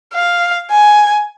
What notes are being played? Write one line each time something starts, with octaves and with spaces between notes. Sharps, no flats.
F5
G#5